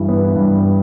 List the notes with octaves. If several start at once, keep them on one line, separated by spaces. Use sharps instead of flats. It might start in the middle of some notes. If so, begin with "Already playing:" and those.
Already playing: G2 E3
B3
G2